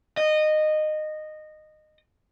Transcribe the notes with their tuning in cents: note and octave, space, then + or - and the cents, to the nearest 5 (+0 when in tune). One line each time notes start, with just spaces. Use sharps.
D#5 -15